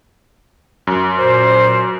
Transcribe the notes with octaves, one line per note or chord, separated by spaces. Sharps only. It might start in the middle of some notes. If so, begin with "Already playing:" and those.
F#2
A#2 C5